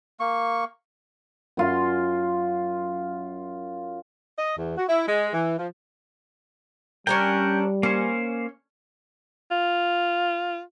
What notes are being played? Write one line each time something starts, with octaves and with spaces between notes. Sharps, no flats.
A#3 C#6
F#2 F4 C6
D#5
E2
F#4
E4
G#3
E3
F3
G3 C#4 D4 A#4 G5
A#3 C#4 C5
F4